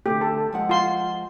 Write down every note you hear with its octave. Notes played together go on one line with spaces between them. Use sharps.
D3 A3 G4
A4
F3 G#3 F#5
F4 C6